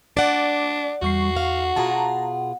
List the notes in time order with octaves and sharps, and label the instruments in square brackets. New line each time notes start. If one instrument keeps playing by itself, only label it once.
[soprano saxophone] D4 [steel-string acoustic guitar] D5 F#5
[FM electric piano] E2 C#6 C7 [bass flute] G3 [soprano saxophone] F#4
[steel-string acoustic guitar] F5 [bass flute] F#5
[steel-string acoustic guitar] B2 F4 G#4 [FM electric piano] A5 A#5